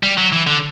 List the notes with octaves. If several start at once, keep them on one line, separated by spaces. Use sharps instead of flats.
G3
F#3
E3
D3